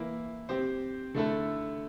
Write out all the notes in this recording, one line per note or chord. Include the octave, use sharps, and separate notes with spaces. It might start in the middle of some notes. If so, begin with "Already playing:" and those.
Already playing: E3 A#3 E4
C4 G4 C5
D3 A3 E4 A4